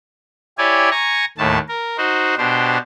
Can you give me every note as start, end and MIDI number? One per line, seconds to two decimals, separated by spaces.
0.58 0.90 64
0.58 0.90 67
0.58 0.90 73
0.58 0.90 74
0.58 0.90 80
0.91 1.25 80
0.91 1.25 82
0.91 1.25 85
1.38 1.58 39
1.38 1.58 45
1.38 1.58 57
1.38 1.58 81
1.68 1.97 70
1.98 2.35 63
1.98 2.35 66
1.98 2.35 72
2.38 2.78 47
2.38 2.78 62
2.38 2.78 67
2.38 2.78 72